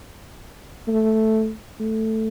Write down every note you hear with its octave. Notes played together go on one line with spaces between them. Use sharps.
A3
A3